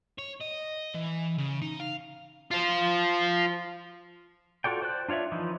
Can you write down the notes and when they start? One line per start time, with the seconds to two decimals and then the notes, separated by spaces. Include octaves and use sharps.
0.18 C#5
0.41 D#5
0.94 E3
1.38 C#3
1.62 D#4
1.80 F5
2.51 F4 C5
4.64 F4 F#4 A4 D5 G5
4.82 C5 D5 G5 F#6
5.09 D4 F4 C#5 D5 E5
5.32 E3 F3 D#4